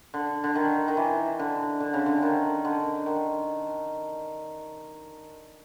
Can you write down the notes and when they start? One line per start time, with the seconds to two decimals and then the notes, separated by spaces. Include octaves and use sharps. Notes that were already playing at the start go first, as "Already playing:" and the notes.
0.14 D3
0.44 D3
0.55 D#3
0.88 D#3
0.97 E3
1.39 D3
1.80 D3
1.94 C#3
2.06 D3
2.22 D#3
2.65 D3
3.06 D#3